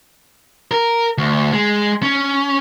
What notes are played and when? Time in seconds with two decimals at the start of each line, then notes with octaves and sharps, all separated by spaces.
0.71 A#4
1.18 D2
1.52 G#3
2.03 C#4